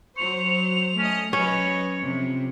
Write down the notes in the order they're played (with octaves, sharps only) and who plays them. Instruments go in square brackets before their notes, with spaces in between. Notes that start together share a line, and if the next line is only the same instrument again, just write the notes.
[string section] F#3 C5 [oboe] C#6 [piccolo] F7
[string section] A3 D#5 [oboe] C#4
[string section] F#3 B4 D#5 [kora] C#4 [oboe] C#5
[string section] F2 C3